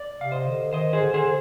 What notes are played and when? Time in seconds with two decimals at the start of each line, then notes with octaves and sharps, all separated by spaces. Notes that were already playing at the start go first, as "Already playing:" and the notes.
Already playing: D5
0.19 C3 F5
0.32 C5 D#5
0.46 D3
0.73 D#3 C5 D#5
0.93 G#4 C5
1.01 D3
1.14 G#4 C5